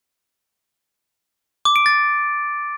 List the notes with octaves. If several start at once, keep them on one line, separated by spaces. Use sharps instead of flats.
D6
D7
A6